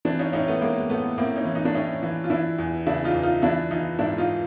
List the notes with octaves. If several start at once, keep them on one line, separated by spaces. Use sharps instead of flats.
E3 C4 D4
C#4 D#4
A2 C#4 D#4
A3 B3
A2 G#3 A#3
A2 A3 B3
A2 A#3 C4
C#4 D#4
E3
D#4
D4
A2 C#4 D#4
E3
F4
E3 D4 E4
E2
C#3 D4 E4
D#4 F4
E2
D#4 F4
E3 D4 E4
E3 D#4 F4
G#2 D4 E4
D#4 F4